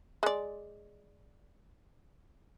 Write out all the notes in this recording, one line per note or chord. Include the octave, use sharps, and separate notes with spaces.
G#3 D5